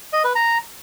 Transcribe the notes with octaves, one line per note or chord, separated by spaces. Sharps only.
D#5
B4
A#5